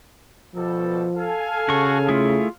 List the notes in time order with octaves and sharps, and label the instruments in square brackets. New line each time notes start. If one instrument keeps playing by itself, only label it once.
[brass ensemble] B2 G3 A4 [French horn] F3
[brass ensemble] A4 F5 G#5
[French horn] C#3 [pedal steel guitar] F#4 C#6
[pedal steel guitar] A3 E4 G#4 [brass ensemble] F4